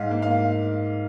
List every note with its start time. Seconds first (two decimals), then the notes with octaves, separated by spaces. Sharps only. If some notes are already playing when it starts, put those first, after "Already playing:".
Already playing: G#2 F5
0.11 A#3
0.22 F5